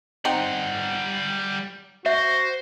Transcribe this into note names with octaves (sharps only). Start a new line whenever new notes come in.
G3 C4 D#4 F#5
F#4 C5 E5